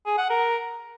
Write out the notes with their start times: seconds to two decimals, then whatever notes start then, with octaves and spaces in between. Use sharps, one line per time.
0.06 G#4
0.18 F#5
0.30 A#4